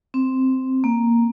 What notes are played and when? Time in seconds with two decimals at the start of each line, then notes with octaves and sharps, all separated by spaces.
0.14 C4
0.84 A#3